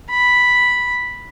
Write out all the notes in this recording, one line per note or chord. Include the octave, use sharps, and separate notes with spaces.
B5